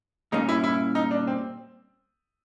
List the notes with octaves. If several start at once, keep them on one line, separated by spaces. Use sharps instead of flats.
A#2 G3 A#3 C#4 D#4
E4
E4
D#4
D4
C4